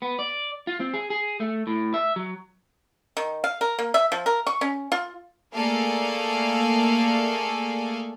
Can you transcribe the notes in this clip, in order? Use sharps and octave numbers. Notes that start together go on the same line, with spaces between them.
B3
D5
F4
C4
G#4
G#4
A3
A2
E5
F#3
D#3
F5
A#4
A#3
E5
F3
A#4
C#6
C#4
F4
A3 A#3 G#4 A4 D5 F5